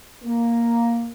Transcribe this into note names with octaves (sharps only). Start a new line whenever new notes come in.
A#3